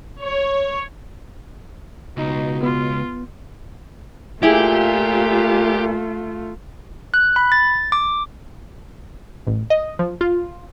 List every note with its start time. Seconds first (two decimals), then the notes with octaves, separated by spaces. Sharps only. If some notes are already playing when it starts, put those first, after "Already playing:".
0.22 C#5
2.17 C#2 B2 D#4
2.63 B3 F4
4.43 A#2 A3 E4 F4 G4 G#4
7.14 F#6
7.36 B5
7.52 A6
7.92 D6
9.47 A1
9.70 D#5
9.99 F3
10.21 F4